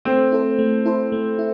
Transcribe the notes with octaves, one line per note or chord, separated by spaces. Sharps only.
A3 C4
E4 A4 C5
A3
E4 A4 C5
A3
E4